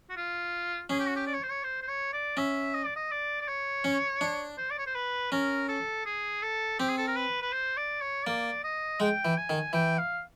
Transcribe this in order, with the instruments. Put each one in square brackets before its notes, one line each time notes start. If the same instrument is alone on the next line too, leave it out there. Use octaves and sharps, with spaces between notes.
[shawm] F#4
F4
[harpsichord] C#4 [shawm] G#4
[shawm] G4
F#4
G4
D5
C#5
C5
C#5
C5
C5
C#5
D5
[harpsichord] C#4 [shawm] E5
[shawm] D#5
D5
D#5
D5
D5
C#5
[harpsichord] C#4
D4
[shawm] C5
D5
C#5
C5
B4
[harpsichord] C#4 [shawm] A#4
[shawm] A4
G#4
A4
[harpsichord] C4 [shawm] G4
[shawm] G#4
A4
A#4
B4
B4
C5
D5
C#5
[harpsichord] A#3 [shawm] D5
[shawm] D#5
[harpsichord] G#3 [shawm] G5
[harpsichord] E3
[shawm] G#5
[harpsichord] D#3
[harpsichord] E3 [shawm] G5
[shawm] F5